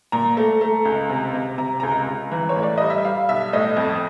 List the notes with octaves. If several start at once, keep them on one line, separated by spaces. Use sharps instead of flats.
A#2 A#5
A3
A3
C#2
C3
C3
C3 A#5
C#2 A#5
C#2
E3
C#5
A2
D5
G3 D#5
E5
G3 F5
B1 E5
A2 D#5
F2